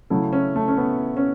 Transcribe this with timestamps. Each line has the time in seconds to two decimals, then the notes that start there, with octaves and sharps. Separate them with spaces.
0.10 C#3 F#3 A3 E4
0.33 C#4
0.56 A3
0.68 C#4
0.77 B3
1.17 C#4